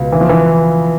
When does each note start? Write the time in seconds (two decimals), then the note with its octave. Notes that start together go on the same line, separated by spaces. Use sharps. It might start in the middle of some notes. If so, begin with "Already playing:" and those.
Already playing: C#2 B2 B3
0.12 E3
0.21 F3
0.29 E3